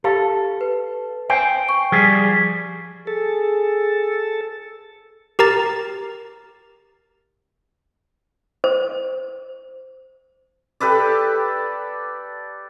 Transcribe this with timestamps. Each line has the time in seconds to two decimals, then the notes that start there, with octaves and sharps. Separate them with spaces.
0.04 G4 A4 F5
0.61 B4
1.30 C5 G5 G#5
1.69 C#6
1.92 F3 G3 G#4
3.07 G#4 A4
5.39 G4 A#4 A#5 A6
8.64 C5
10.80 G4 A4 B4 D5